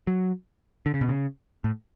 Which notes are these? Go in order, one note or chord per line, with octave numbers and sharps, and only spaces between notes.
F#3
D3
C#3
B2
C#3
A2